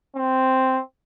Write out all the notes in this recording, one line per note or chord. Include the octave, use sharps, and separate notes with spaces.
C4